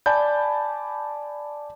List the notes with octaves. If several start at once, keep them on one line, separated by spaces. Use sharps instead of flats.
D5 G#5 A5 B5 G6